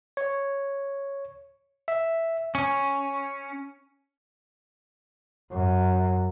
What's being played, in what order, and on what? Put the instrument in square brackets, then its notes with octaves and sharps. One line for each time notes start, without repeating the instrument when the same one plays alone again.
[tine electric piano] C#5
E5
[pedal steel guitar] C#4
[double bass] F#2